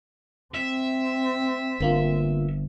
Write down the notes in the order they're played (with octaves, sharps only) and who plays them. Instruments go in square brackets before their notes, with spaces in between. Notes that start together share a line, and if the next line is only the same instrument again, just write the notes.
[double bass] C4 [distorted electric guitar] E5
[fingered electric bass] G1 [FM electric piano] D3 A#3 F4